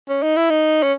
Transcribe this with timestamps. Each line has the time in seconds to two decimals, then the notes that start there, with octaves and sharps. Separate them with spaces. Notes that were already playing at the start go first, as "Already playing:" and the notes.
0.09 C#4
0.23 D#4
0.36 E4
0.50 D#4
0.83 C#4